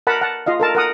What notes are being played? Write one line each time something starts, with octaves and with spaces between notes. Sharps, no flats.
A#4 F#5 A5 B5
F#5 A5
F4 D#5 F5
A4 A#4 A5
A#4 F#5 D#6